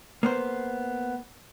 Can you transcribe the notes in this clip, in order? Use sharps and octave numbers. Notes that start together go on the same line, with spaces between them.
A#3 B3 C5